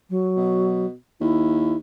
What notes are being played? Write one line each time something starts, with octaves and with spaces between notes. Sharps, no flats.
F#3
B2
D#2 E4